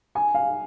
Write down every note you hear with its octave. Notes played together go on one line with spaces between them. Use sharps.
G#5
F5